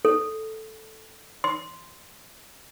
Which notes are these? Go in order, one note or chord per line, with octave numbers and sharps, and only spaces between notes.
A4
C6